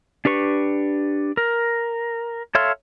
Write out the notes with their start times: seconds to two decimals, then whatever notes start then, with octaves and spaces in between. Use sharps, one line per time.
0.25 D4 G4 B4 C#6
1.37 A#4
2.55 A4 C#5 E5 F5 C6